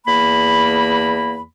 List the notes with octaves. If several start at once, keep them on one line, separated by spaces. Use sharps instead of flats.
E2 A#3 B5